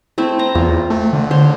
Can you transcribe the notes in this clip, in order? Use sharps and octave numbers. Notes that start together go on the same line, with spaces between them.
A3 C4 E4
C5 A#5
E2 F4
A3
D3
C5 C#5 C6